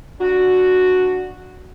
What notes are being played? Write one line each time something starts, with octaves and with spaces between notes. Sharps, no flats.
D4 F#4